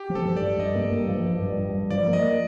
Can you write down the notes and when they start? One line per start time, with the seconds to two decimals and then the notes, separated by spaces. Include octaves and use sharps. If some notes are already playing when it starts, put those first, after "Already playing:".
Already playing: G4
0.10 F3
0.15 A4
0.25 G2
0.37 D5
0.42 G2
0.59 G2 D#5
0.76 A#3
0.92 G2
1.08 F3
1.25 G2
1.42 G2
1.58 G2
1.74 G2
1.91 F3 D5
2.08 A#3
2.13 D#5